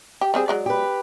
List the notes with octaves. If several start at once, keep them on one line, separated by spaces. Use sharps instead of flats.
G4
G3 C4 G#4
F#3 G#3 D5
G4 B4